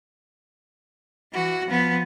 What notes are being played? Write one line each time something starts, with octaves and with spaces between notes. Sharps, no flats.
E3 F#4
F3 B3